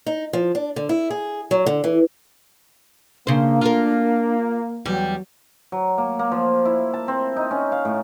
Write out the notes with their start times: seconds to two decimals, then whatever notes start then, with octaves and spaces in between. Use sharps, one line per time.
0.06 D#4
0.33 F3
0.55 D4
0.76 D3
0.89 E4
1.10 G#4
1.51 F#3
1.66 D3
1.84 E3
3.27 C#3 A#3 D4 C5
3.61 F4 A#4
4.85 E2 F#3 G3
5.72 F#3
5.98 A#3
6.19 A#3
6.32 F3
6.65 E4
6.94 A5
7.08 C4
7.36 D#4
7.51 C#4
7.72 F5
7.85 A2